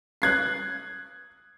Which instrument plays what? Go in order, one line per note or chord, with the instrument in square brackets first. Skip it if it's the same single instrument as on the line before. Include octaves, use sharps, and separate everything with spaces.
[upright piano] F#6 G#6 C7